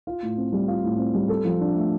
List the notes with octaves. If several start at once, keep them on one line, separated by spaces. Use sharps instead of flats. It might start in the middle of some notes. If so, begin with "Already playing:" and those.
F4
A2
C4
G3
F4
A2
C4
G3
A4
F3
D4
A3